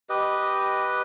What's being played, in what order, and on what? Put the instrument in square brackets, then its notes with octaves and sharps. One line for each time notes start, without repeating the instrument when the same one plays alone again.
[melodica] G4 B4 D#5